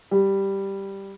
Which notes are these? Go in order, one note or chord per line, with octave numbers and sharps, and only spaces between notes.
G3